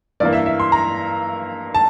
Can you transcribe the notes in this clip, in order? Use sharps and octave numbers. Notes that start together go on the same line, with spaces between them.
G2 E3 A#3 D5
E5
E5
C6
A#5
A5